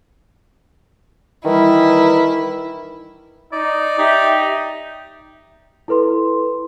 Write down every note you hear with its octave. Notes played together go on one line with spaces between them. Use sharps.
D#3 E3 G3 E4
D#4 D5
D#4 G4 E5
E4 A4 B4 C6